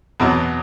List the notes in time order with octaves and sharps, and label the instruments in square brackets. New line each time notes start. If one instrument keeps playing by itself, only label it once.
[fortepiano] E2 B2 F#3